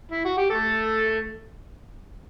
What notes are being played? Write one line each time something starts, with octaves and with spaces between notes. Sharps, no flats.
E4
F#4
G4
A3 A4